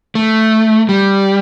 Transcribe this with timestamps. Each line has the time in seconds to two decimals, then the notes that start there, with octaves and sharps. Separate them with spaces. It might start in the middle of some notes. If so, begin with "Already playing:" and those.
0.15 A3
0.89 G3